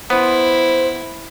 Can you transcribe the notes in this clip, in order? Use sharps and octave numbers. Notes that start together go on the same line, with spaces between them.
B3 E4 C5